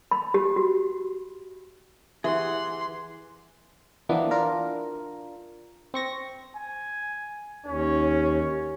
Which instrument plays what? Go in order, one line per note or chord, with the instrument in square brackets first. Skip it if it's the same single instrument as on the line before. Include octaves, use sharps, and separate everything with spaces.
[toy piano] B5
G4
F#4
[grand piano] E3 [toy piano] G4 E5 [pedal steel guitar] G#4 F#5 [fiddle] C6
[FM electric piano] E3 F3 A#3 B3 D4
D4 F4 A#4
C4 C#6 A#6
[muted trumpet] G#5
[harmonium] D#2 [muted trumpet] C#4